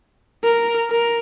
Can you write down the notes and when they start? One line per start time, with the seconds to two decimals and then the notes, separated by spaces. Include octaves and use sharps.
0.44 A#4
0.91 A#4